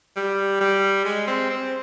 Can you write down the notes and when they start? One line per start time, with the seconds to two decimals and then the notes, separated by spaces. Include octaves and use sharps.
0.16 G3
0.60 G3
1.05 G#3
1.27 C4
1.50 C4